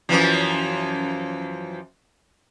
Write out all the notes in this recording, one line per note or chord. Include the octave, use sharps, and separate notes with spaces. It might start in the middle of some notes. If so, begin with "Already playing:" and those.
F#2 E3 F3